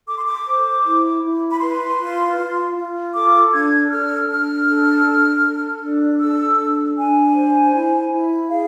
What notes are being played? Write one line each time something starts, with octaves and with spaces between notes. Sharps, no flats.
A4 D6
C6
D6
C5
E4
E4
B5
B4 C6
F4
F4
F4
A4 D6
D4 G#6
A4 F6
D4 F6
A4
D4
A4
D4
A4 E6
D4
D4 G#5
C5
E4
E4
G#4 F5